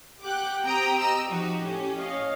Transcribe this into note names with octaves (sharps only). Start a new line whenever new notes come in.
G4 F#5 G5 D6 F#6
C4 G4 G5 A#5 D#6
D#5 A#5 E6
F3 D#4 F#4 G4
A2 C#4
C#5 D#5 F5